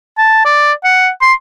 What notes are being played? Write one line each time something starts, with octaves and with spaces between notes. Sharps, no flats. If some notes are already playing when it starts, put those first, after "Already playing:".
A5
D5
F#5
C6